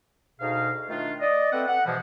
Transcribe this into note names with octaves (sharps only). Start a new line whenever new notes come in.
D2 B2 D#4 G#4 F5
D#3 A3 D4 F4
D5 D#5
A3 C4 B4 E5 F#5
F#5
G#2 B2 E3 F3 G3 G#3